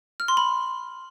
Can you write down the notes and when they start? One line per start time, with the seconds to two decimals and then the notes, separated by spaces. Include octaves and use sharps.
0.20 F6
0.28 C6
0.37 B5